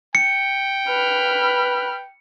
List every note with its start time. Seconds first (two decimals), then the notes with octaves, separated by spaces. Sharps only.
0.15 G5 C#7
0.88 B4 B5 F6